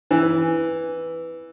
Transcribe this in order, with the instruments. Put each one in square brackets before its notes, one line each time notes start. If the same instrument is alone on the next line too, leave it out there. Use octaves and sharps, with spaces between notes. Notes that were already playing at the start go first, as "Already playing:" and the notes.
[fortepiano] E3